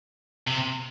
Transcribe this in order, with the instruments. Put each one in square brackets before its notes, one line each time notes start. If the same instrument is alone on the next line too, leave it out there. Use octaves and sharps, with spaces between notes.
[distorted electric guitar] C3